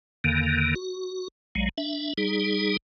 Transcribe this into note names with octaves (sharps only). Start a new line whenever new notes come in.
E2 D3 D#3 A#3
F#4
A#1 F#3 G#3
D4 E5
G3 D#4 G#4